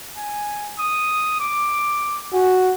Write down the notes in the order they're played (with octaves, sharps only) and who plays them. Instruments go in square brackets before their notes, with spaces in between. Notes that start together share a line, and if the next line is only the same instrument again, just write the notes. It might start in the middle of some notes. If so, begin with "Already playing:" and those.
[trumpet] G#5
D#6
D6
[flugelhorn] F#4 [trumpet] G#5